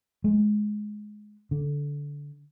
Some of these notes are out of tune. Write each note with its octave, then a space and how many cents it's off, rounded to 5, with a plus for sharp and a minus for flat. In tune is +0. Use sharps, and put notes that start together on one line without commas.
G#3 +15
D3 -15